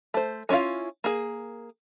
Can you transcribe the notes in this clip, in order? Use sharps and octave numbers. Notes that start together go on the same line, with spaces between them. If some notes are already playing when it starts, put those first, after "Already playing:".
A3 C5
G#3 C#4 E4 F4 F5
A#3 G#4